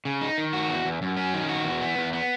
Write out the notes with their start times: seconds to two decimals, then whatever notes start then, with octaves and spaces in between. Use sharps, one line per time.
0.05 C#3
0.21 D#4
0.38 D#3
0.53 F#4
0.69 E2
0.85 E2
1.02 F#2
1.17 C#4
1.34 D#3
1.49 F#4
1.65 E2
1.81 B3
1.98 E2
2.13 B3